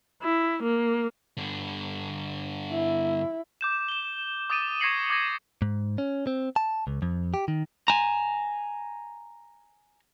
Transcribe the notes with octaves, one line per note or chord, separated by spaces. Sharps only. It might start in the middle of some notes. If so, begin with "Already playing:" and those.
E4
A#3
G2 D3
E4
D6 G6 E7
E7 G7
D6 D#6 A6 D7 D#7
C#6 G#6 A#6 C7 C#7 F#7
D6 D#6 G#6 A#6
G#2
C#4
C4
A5
C#2
F2
G4
D#3
G#5 A#5